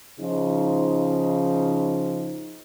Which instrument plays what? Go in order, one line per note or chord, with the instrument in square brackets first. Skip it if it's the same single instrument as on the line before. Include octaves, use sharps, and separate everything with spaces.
[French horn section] C#3 F3 D#4